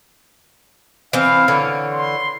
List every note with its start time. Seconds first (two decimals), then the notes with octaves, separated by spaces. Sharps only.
1.13 E3 C4 F5
1.48 D3 E3 C#5
1.93 C6